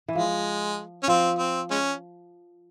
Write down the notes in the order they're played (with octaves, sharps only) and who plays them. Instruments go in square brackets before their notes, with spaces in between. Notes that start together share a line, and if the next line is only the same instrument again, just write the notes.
[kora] E3
[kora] F3 [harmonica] G#3
[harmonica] C#4
[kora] F3 [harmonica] C4
[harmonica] C4
G#3 C#4